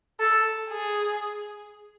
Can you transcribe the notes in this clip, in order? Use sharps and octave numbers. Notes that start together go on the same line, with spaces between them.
A4
G#4